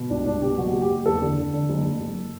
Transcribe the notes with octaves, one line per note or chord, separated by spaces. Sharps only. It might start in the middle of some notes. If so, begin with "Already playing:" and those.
Already playing: B2
C2 D4
C2 D4
B2 G4
F#1 F#4
F#1
G4
F#1
E2 A4
D3
D3
D3
F#1
F#1
F#1